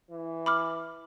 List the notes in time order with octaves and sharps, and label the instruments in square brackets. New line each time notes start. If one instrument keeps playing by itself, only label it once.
[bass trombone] E3
[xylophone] B5 D6 F6